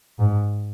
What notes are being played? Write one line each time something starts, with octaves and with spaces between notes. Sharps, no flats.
G#2